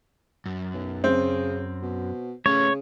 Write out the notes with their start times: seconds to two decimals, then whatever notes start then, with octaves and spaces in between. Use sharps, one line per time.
0.46 F#2
0.73 B1
1.04 C#3 C4
1.82 B2
2.46 C#3 A3 C#4 C#5